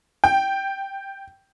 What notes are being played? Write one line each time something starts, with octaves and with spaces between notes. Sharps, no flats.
G5